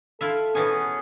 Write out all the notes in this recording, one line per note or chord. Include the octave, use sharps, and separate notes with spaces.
E4 F4 A4 E5
B2 E3 B3 C#4 G#4 G#5